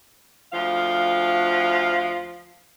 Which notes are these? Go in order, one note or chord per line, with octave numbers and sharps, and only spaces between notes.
D2 F3 F5